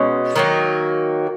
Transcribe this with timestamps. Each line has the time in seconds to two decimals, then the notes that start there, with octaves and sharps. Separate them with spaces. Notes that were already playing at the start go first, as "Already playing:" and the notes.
Already playing: B2 G#3 C#4
0.36 D#3 F#3 A#3